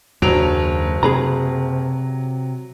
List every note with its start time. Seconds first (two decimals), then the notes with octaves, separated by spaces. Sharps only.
0.22 F#1 D#2 F#3 D4 D7 F7
1.03 C3 G#4 B4 A#5